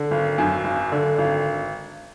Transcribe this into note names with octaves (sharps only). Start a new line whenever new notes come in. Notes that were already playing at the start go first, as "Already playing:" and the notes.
Already playing: D3
G#1
F#2
G#1
D3
G#1